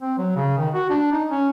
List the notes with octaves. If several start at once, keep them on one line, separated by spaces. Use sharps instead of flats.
C4
F#3
C#3
D#3
F#4
D4
D#4
C#4